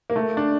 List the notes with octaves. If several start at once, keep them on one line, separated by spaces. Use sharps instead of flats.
A#3
A3
D4